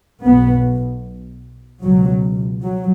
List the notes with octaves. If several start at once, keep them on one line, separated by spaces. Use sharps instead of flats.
B1 B2 B3
C#2 B2 F#3
F#3